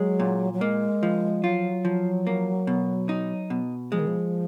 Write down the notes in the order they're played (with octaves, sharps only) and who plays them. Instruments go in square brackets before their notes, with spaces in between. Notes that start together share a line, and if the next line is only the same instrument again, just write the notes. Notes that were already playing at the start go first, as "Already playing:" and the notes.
Already playing: [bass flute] F#3 [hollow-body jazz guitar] G#3
[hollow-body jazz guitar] A#2
[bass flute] F#3
[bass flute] G#3 [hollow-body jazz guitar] A#3
[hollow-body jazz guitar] F3
[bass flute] F#3 [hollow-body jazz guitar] F4
[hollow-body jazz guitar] F3
A#3
B2
D#4
B2
[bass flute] F3 [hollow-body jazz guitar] G#3
[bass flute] D#3
F3